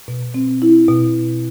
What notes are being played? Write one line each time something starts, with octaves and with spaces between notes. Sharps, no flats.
B2
C4
E4
B2